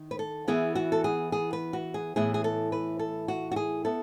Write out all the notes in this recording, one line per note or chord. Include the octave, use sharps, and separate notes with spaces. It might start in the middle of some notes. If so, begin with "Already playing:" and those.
Already playing: D#3 E4
B4
A4
E3 B3 E4 G#4
F#4
A4
G#4
G#4
B4
F#4
G#4
A2 E3 B3 E4 G#4
G#4
A4
B4
A4
F#4
F#4
G#4
B3 E4 A4